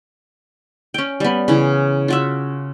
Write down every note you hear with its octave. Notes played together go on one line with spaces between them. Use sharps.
C#4 G5
G3 B3
C#3 E3
F4 F#4 E5